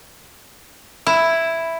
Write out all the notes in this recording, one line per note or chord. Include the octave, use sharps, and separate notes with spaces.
E4